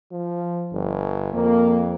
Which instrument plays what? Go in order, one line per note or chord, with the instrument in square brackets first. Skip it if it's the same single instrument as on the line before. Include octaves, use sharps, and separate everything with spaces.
[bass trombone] F3
G1
[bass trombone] F2 [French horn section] A#3